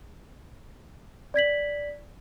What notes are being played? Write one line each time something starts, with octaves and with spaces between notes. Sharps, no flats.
D5 G#6 B6 F#7